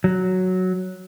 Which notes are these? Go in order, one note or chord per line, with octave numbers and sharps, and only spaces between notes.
F#3